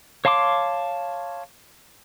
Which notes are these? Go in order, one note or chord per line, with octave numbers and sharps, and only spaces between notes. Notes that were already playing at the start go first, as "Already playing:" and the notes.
C#5 F5 A5 C6 D6